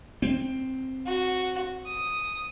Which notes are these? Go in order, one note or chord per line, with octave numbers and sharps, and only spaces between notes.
C4
F#4
D#6